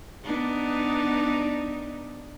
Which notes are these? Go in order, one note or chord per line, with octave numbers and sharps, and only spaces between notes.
B3 D4 D#4